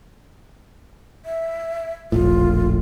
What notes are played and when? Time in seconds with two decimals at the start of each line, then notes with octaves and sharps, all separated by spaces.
1.25 E5
2.12 E1 A#1 A2 F4